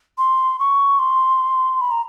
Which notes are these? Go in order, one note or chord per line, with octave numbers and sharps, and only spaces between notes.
C6
C#6
C6
B5
A#5